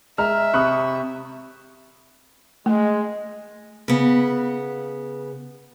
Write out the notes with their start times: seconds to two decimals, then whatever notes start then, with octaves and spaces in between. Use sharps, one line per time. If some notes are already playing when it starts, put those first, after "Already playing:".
0.18 G#3 E5 A#5 F6
0.54 C3 B5 C#6 D#6 F#6
2.66 G#3 A3
3.88 C#3 B3